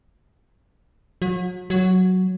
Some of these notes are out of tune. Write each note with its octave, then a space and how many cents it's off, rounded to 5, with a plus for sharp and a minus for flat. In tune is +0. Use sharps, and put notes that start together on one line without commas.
F#3 -35
F#3 +0